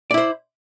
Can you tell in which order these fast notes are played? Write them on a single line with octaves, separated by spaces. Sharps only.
D5 E4 C5